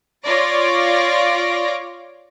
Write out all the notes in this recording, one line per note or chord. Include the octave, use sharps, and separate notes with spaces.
F4 C#5 D5 A#6 D7